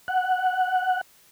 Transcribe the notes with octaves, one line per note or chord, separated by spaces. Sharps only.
F#5